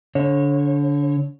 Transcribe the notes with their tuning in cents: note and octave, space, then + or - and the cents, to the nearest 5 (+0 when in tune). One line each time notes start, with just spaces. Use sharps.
D3 -25 C#5 -25